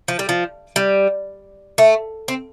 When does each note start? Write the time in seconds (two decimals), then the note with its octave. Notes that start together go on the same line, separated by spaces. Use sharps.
0.08 F3
0.19 G3
0.29 F3
0.76 G3
1.78 A3
2.28 C4